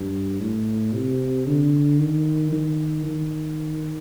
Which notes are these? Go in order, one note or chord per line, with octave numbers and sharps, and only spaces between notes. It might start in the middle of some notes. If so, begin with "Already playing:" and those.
Already playing: G2
A2
C3
D3
D#3
D#3
D#3